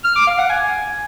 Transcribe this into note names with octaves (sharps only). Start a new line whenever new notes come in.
F6
D6
F5
F#5
G#5